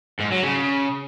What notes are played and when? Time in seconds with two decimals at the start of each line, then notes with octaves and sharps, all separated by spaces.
0.20 G#2
0.32 F#3
0.43 C#3